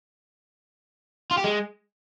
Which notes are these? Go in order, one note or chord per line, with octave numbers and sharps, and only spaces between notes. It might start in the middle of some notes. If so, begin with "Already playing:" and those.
F4
G4
G#3